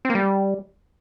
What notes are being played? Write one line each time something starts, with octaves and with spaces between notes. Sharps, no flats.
C4
A#3
G3